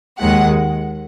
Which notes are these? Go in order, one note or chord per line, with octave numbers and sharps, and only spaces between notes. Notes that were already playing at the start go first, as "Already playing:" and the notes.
D#2 D#3 G#3 F#5